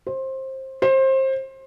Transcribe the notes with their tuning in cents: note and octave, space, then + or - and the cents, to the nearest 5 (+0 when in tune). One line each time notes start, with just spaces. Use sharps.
C5 +20
C5 +25